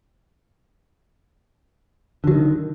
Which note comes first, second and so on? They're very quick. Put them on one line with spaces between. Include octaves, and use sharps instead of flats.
D3 F#3 D#3